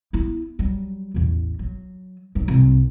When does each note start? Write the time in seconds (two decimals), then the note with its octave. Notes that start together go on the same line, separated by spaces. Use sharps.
0.13 B3 E4
0.59 F#3 G3
1.14 A1 E2
1.59 F#3
2.35 F#3 D#4
2.48 C2